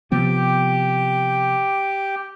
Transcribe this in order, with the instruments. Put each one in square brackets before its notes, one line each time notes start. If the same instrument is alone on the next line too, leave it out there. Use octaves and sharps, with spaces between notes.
[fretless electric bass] C3 F3 B3 [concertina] G4 G5